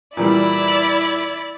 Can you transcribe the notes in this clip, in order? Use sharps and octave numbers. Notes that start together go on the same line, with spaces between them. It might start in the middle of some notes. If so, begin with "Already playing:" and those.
A#2 E3 G3 E4 D5